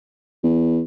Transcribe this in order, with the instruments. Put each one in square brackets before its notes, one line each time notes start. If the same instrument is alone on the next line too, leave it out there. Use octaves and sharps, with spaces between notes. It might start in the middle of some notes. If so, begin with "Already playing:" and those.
[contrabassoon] E2